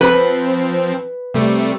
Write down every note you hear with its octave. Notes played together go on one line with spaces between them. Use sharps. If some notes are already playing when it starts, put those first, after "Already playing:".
F3 C4 B4
C3 G3 A3